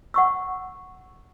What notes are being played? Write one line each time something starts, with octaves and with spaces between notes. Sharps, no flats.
F#5 C#6 E6